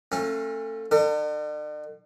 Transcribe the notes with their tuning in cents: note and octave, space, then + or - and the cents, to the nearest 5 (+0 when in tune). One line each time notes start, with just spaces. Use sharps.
A3 +20 C#4 -35 F4 +25
D3 +45 A4 +45